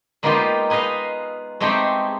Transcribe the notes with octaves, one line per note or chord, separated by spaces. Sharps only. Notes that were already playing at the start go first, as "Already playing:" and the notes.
G#3 A#3 B3 D#4 F4 G4
D#4 G#4 B4 D#5 F5
G#3 A3 C4 D#4 G4 G#4